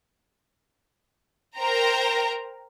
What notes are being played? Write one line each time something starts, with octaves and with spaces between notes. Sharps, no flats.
A#4 C5 G5 A#5